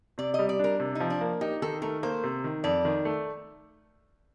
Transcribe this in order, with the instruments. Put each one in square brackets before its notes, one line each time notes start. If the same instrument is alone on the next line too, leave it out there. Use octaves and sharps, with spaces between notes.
[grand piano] C3 [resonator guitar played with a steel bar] D5
[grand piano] G3 [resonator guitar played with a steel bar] D#5
[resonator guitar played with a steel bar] D5
[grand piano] D4 [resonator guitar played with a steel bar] A#4
[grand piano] C3
[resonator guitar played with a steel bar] D#4
[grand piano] F3
[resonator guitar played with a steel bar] D4
[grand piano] A#3
[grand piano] D#4 [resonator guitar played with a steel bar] G4
[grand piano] D#3 [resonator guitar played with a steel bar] A4
[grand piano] A3 [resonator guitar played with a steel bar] A#4
[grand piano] A#3 [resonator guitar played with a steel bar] C5
[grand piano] C3
D#3
[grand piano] F2 [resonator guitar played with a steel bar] D5
[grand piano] D#3
A3